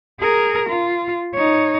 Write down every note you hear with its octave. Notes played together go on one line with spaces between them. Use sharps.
G#4 A#4
F4
D#4 C#5